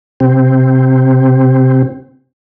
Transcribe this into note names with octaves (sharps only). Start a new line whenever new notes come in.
C3 C4